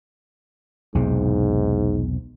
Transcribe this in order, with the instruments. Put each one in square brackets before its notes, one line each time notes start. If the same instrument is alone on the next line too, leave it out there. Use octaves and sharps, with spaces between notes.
[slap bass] B1 E2 C3 [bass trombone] G#2